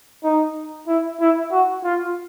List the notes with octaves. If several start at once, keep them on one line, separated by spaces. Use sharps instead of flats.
D#4
E4
E4
F#4
F4